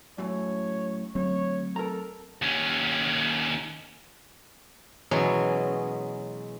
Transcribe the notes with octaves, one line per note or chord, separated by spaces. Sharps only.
F#2 A2 C#5
D2 F#3 A3 C4 C#5
A4 A#4 A#5
D#2 C#4
B2 E3 F#3 G#3 C#4